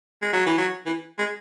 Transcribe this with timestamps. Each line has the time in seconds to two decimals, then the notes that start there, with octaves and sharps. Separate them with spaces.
0.22 G#3
0.33 F#3
0.46 E3
0.58 F#3
0.86 E3
1.18 G#3